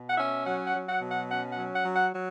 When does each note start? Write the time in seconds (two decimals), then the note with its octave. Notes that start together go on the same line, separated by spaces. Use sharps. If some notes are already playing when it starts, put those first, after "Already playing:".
Already playing: B2
0.10 F#5
0.18 C#4 E5
0.46 F#3 F#5
0.67 F#5
0.74 F#3
0.89 F#5
1.02 B2
1.11 F#5
1.30 C#4 F#5
1.53 F#3 F#5
1.74 F#5
1.85 F#3
1.96 F#5
2.13 F#3